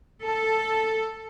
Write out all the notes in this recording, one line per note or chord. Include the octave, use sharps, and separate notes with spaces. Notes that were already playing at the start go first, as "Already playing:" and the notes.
A4